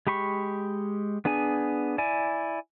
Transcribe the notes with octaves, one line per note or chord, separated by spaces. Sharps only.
G#3 G4 B5 C#6
B3 D4 G#4 G#5
E4 D5 G#5